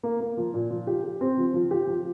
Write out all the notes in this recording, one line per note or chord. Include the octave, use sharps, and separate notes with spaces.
A#3
A#3
F3
A#2
F3
G4
G4
C4
F3
F3
G4
F3